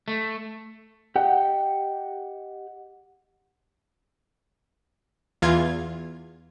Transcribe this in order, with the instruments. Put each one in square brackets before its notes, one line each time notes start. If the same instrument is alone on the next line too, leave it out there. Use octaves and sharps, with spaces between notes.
[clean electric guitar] A3
[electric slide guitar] G4 D#5 F#5 G5
[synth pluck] E2 F4 G#6